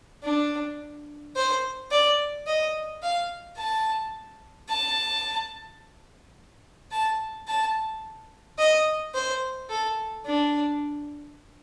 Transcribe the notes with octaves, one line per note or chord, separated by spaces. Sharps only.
D4
C5
D5
D#5
F5
A5
A5
A5
A5
D#5
C5
A4
D4